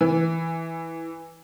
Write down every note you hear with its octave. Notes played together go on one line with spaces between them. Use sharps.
E3